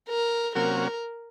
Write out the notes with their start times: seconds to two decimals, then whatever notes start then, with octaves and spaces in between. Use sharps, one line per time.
0.09 A#4
0.55 C3 F#3 A#3 C#4 F#4 A#4